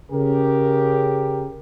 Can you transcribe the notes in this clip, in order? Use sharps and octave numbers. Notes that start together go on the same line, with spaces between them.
C#3 G4 A#4